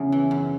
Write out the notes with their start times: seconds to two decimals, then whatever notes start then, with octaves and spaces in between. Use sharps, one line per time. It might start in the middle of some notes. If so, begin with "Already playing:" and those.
Already playing: E2 C#3 C#4
0.12 E3
0.31 F#2